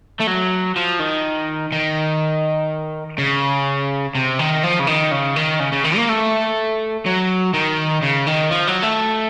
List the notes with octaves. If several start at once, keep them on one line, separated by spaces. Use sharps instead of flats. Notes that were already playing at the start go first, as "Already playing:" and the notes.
A3
F#3
F3
D#3
D#3
C#3
C3
D#3
F3
C#3
D#3
C#3
D#3
C#3
C#3
D#3
A#3
A3
F#3
D#3
C#3
D#3
F3
F#3
A3